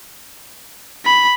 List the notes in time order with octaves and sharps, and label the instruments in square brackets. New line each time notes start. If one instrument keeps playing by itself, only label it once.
[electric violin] B5